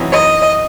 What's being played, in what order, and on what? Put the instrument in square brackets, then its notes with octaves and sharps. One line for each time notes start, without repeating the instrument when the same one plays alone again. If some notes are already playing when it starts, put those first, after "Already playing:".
Already playing: [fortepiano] F#2 E3 C4 D#4
[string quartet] D#5